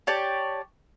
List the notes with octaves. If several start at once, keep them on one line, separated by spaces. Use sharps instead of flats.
G4 C#5 D5 A5